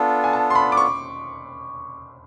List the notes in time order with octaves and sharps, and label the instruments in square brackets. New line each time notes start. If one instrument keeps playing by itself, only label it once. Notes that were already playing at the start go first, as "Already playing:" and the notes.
Already playing: [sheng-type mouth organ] B3 D4 F4 A4
[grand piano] G#5
A5
C6
B5
D6
C#6